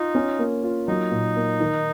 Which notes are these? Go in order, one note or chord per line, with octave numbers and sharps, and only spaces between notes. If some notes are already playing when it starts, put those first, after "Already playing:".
Already playing: D#4 F4
C#4
A#3
F4
F#3 D#4
A#2
A#3
D#3